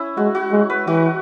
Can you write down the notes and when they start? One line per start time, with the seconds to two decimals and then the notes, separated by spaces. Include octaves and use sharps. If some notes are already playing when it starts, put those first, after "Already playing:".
Already playing: C#4 E4
0.17 G#3 F#4
0.35 F#4
0.52 G#3
0.70 B4
0.87 E3 F#4